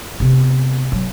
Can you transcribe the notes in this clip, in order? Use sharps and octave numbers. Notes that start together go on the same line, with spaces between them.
C3 B3
F#3